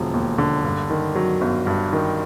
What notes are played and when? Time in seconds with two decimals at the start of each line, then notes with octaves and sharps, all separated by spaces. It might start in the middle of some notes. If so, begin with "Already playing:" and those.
Already playing: E1 D3 F3
0.14 D#2
0.38 D3
0.64 G2
0.90 D#3
1.15 F#3
1.41 G1
1.67 G2
1.93 D#3